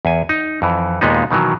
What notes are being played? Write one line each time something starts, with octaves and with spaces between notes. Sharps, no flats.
E2 G#5
D#4
F2 E3
D#2 A#2 G#3 B3 D#4
B2 D#3 E3 F#3